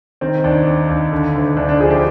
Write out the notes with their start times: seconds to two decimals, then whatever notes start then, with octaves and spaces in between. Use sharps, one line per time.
0.21 D#3 C4
0.44 D#2 D4
0.67 D#3
0.90 D#2
1.12 D3
1.35 D2
1.57 D2 D4
1.69 D4
1.80 F3 G#4
1.91 G4